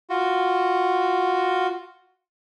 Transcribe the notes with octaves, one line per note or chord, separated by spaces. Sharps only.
F4 F#4